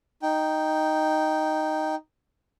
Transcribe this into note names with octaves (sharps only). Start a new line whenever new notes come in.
D#4 G5